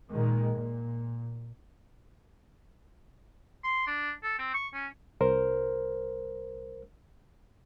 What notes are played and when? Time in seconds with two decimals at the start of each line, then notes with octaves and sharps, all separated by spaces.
0.12 A#2 D#3 G#3
0.55 A#2
3.64 C6
3.87 D4
4.23 A4
4.39 C4
4.54 C#6
4.74 C#4
5.21 C2 A#4 C5